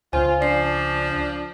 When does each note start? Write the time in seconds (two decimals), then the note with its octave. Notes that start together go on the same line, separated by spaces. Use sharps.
0.13 C#2 C#3 F4 C5 G#5
0.40 F3 D4 D5 C7